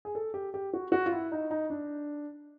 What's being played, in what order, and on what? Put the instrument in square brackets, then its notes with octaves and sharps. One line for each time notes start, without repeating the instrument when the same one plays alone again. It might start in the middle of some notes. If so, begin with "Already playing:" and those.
[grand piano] G#4
A4
G4
G4
F#4
F#4
F4
E4
D#4
D#4
D4